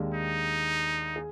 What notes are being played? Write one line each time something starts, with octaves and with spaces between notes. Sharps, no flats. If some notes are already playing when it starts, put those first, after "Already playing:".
Already playing: D#2 D#3 G#3 D4 G4
D#4
G#4